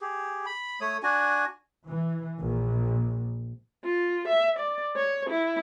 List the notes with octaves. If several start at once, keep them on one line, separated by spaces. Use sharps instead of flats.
G4 G#4
B5
A3 C#5 D#6
D4 F#4 G#5
E3
A#1
F4
E5
D5
C#5
E4